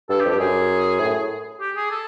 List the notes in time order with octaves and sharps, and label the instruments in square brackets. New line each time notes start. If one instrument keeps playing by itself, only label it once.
[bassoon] G2 [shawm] A4
[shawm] G4
[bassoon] F2
[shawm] G4
[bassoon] G2
[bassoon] F#2 [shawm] G#4
[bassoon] A2
[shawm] G4
G#4
A4